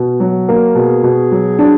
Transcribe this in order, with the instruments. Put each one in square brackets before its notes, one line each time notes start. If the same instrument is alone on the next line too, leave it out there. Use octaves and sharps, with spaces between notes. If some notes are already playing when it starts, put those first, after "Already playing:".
Already playing: [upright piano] B2
F#3
A#3
[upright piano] B2 [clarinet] G#4
[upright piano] B2
F#3
D4